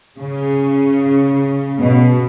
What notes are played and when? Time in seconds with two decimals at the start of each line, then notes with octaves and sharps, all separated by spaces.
0.18 C#3
1.81 B2